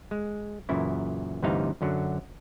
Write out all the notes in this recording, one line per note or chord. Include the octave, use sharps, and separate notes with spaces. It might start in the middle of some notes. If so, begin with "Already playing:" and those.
G#3
F#2 A#2 C#3 E3 E4
D2 G2 C3 E3 D#4 F5
F#2 D3 F#3